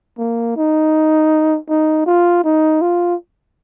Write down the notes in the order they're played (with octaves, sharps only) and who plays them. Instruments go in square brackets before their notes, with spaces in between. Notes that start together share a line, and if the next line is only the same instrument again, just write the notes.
[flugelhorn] A#3
D#4
D#4
F4
D#4
F4